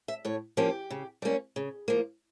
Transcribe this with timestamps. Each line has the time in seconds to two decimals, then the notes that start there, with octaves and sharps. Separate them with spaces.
0.08 E5
0.25 A2 C#5
0.57 F3 A#3 C#4 G4
0.90 C#3
1.22 G3 A#3 C#4
1.56 C#3
1.88 F3 A#3